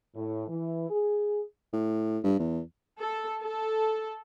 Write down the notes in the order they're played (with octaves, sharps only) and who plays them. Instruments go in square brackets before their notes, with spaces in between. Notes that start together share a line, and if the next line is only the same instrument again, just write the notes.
[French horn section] A2
E3
G#4
[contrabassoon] A2
G2
E2
[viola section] A4
A4